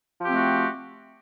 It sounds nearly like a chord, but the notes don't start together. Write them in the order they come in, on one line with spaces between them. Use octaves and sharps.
F3 G4 C4 A3 F#4